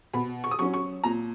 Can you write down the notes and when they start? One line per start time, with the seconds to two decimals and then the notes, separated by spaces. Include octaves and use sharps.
0.13 B2 B5
0.44 C#6
0.51 D#6
0.59 F#3 C#4 C#6
0.74 C#6
1.04 A#2 A#5